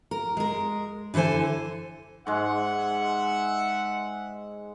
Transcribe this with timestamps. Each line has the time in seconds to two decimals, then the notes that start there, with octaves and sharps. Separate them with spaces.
0.11 A#4
0.37 G#3 A#4
1.14 D3 E3 A4 C5 G#5
2.27 G#2 G#3 E5 F#5